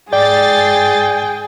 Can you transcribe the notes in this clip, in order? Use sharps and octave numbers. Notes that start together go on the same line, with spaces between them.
G#2 G#4 D5 G5 A6 C7